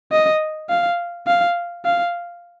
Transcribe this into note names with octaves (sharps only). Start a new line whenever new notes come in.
D#5
F5
F5
F5